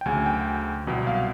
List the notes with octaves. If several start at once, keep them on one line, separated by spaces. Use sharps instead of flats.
G5
D2 C#3 F#3 G#5
G5
C2 B2 F#3
F5